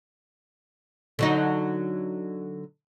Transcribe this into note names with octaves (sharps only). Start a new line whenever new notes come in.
D3 F#3 D#4